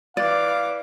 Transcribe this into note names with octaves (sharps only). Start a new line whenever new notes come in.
E3 D5 F5 D6